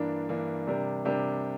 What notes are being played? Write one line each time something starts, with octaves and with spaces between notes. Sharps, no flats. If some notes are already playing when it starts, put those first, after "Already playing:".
Already playing: G2 E3 A#3 D4
G2 E3 A#3 D4
C3 G3 D4 G4 A#4
C3 G3 D4 G4 A#4